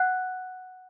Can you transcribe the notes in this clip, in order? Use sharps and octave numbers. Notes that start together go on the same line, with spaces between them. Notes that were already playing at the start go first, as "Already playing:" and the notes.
Already playing: F#5 F#6